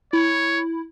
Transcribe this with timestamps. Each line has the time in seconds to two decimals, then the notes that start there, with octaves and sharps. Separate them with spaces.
0.13 E4 C#5